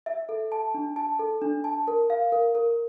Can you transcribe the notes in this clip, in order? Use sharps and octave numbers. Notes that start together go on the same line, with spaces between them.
E5
A4
A5
D4
A5
A4
D4
A5
A#4
F5
A#4
A#4